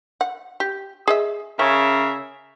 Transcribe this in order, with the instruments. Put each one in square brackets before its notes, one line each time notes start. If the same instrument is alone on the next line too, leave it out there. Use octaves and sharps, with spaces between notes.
[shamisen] F#5
G4
G#4 D#5 E5
[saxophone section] C#3 A#4 E5 [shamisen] C#4